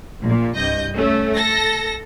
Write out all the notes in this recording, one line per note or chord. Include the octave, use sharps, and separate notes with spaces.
A#1 A#2
C2 G2 D#5 G6
A3 C#4
A4 A#6